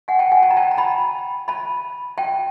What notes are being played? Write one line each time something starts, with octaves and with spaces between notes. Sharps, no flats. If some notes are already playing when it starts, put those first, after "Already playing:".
F#5 G#5
G5 A5
F#5 G#5
A5
A#5
G5 A5
A#5
A5 B5
A5 B5
G5 A5